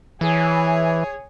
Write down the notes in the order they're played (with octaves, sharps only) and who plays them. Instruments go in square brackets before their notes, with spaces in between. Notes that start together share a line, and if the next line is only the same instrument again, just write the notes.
[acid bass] E3 [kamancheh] G#4 C#5